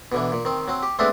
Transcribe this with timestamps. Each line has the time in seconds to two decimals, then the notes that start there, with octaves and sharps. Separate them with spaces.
0.12 B2 D3 E3
0.32 A#2
0.45 D#3 C4
0.68 F#3 C4
0.83 G4
0.99 G#3 A3 B3 C4 D4 E4